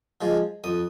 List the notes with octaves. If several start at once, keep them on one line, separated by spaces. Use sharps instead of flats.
F3 G#3
F2 D#6